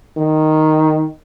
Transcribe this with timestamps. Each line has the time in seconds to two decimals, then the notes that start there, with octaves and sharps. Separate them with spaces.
0.17 D#3